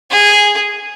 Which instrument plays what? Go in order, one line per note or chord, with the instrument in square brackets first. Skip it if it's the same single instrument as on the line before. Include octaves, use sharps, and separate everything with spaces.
[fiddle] G#4